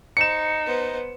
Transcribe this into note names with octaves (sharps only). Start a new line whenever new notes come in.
D#4 C5 C#7 E7
B3 C5